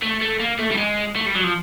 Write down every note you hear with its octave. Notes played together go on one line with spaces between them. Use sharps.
A3
A3
A#3
A3
G3
G#3
A3
G3
F#3
F3